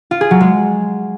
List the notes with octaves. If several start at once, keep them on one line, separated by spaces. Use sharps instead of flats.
F4
G#4
F#3
G#3